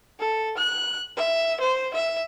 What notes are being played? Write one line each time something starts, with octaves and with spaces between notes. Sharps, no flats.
A4
F#6
E5
C5
E5